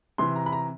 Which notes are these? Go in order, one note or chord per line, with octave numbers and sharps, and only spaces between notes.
C3 E3 C6
A#5
B5
A#5